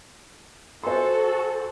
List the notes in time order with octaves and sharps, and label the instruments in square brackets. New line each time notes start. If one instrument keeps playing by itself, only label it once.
[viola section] F#4 A4 [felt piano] C5 G#5 C6